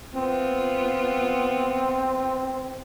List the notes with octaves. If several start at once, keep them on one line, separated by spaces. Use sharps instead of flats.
B3 C4 F4